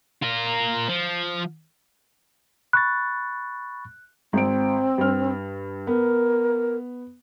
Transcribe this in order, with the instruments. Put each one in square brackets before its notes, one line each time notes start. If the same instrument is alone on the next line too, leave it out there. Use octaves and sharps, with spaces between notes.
[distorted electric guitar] F4 A#4
F3
[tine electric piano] B5 C#6 A6 [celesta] F#6
[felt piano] G#1 D7 [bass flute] C4
[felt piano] G2 F6
[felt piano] B3 [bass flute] A#4